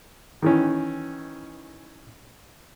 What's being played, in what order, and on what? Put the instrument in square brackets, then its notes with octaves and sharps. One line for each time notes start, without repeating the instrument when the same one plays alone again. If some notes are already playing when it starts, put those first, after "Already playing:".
[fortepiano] D#3 E3 C#4